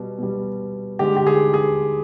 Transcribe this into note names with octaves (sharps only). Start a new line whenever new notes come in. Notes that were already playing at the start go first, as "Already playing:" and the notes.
Already playing: B2 G3
B2 G3
D3 G#3 G4
G4
G#4
G#4